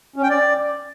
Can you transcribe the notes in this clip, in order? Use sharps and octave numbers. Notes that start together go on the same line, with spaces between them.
C#4
G5
D5